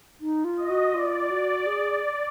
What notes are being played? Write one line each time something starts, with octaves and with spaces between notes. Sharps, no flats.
D#4
F4
D#5
F#4
F4 D5
F#4
G#4